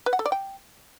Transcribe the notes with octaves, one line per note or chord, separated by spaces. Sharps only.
B4
F#5
A4
D5
G5